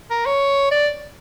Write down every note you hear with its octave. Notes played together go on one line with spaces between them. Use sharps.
A#4
C#5
D5